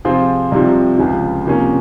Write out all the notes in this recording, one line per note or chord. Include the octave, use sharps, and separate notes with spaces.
C3 F3 C4 F4 G#4
C2 C3 F3
C#2 C#3 F3
C3 F3 A#3 C#4